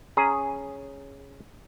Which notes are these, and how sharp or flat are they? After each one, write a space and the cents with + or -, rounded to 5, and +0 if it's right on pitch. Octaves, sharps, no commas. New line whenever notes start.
C#4 +0 G#4 +0 A#5 -5